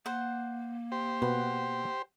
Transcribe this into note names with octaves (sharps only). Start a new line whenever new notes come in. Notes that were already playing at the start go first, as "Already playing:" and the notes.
A#3 C5 F#5
G4 C5
B2 B4 F#5